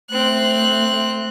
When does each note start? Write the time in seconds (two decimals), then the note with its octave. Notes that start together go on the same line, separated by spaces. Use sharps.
0.10 A3 C4 F#6